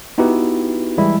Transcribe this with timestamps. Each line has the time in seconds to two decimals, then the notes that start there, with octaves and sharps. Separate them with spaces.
0.18 B3 D#4 E4 F#4 G4 B4
0.98 E3 G3 G#3 E4